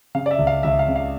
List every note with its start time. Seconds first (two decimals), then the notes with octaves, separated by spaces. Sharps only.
0.15 C#3 F5
0.26 D5
0.31 E5
0.39 C#2
0.47 F5
0.63 C#2 E5
0.79 F5
0.88 C#3
0.96 F5